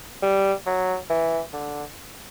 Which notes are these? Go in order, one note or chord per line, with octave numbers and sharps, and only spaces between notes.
G3
F#3
E3
D3